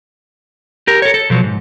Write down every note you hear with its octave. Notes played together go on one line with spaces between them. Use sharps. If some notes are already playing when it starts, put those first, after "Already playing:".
G4 A#4
A4 C#5
A4
B2 F3 F#3
G#2